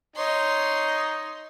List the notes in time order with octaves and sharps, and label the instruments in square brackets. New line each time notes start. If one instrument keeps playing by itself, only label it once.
[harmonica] D#4 [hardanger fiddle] C#5 C6